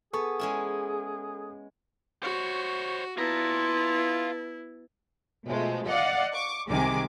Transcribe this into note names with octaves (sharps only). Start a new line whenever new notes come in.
B3 G#4 A4 C#6
G#3 C#4 E4
F#4 C5 C#5
B3 E4 F4 A5 A#5
B2 F3 G#3 A3
D5 D#5 F5 F#5
C#6 D6
C2 C3 D#3 G#3 G#5 D6